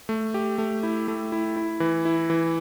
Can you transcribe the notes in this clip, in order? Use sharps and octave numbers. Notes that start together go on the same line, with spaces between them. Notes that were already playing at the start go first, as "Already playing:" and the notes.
A3
G4
A3
E4
A3
E4
E4
E3
E4
E3